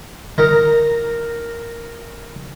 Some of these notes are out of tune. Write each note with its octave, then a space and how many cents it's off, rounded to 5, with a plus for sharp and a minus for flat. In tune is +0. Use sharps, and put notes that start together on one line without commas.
D#4 +10 A#4 +0 A#5 -15